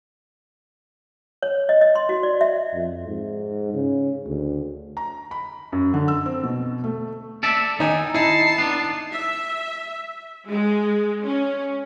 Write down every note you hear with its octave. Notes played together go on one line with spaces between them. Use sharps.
C#5
D#5
D#5
C6
F#4
D5
E5
F2
G#2
C#3
D2
A#5
B5
F#2
D3
E6
C4
B2
A3
A4 D5 E5
D#3 D#4 G#5
D#4 E4 A5 C7
B3 D4
E5
G#3
C#4